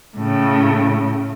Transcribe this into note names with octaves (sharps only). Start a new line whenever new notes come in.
A2 C#3